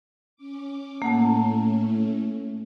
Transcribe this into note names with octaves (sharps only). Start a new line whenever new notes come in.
C#4 D6
A2 A3 A#3 C#4 F#5 A5